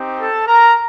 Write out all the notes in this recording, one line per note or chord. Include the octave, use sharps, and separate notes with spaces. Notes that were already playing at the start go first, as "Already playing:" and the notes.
Already playing: C4 D#4 G4
A4 A5
A#4 A#5